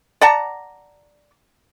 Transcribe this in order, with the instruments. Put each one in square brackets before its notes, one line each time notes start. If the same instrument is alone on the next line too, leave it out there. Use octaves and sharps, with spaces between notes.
[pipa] D5 F#5 A5 A#5